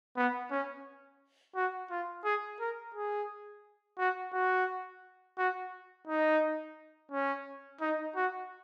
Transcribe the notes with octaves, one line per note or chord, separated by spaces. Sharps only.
B3
C#4
F#4
F4
G#4
A#4
G#4
F#4
F#4
F#4
D#4
C#4
D#4
F#4